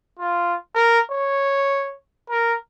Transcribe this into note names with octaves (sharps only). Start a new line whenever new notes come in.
F4
A#4
C#5
A#4